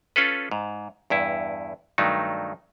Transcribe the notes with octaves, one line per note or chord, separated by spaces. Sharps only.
C#4 F4 A4 B4
G#2
E2 G2 E4
G2 D#3 F#3 A3 D#4